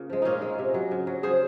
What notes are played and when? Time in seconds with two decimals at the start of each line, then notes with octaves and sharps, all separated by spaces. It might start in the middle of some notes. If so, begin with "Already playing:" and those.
Already playing: C#3 A#3 F4
0.10 F3 G#3
0.22 A#2 C#4 D#4 F4
0.42 G#3
0.59 C3
0.74 F#3
0.91 C#3
1.07 F#3
1.23 C#3 G#4 C5